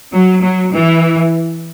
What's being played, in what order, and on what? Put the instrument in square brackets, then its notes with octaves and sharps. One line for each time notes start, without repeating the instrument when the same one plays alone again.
[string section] F#3
F#3
E3